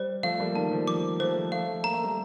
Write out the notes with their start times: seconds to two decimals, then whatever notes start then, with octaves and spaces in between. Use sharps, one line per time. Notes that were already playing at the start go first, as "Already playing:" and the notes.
Already playing: G3 C5
0.23 F3 A3 F5
0.40 G3 A#3
0.55 D#3 G3 A5
0.72 F3
0.87 F3 D6
1.20 F3 A3 C5
1.52 F3 A3 F5
1.83 A#3 A#5
1.93 A3
2.04 G3 A#3